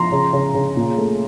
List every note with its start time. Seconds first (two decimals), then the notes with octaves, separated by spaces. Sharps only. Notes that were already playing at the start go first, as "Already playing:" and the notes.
Already playing: F3 A#5 C6
0.12 C#3
0.33 C#3
0.54 C#3
0.76 A#2
0.98 A3